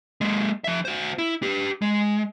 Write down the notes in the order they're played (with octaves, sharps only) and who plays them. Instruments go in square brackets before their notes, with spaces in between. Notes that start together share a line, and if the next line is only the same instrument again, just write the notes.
[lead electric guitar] G#3 A#3
F3 E5
F#4 C5
E4
G4 B4
G#3